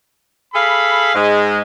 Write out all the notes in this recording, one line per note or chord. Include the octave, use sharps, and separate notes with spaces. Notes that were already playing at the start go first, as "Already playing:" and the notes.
G#4 A4 F5 B5
G#2 G#3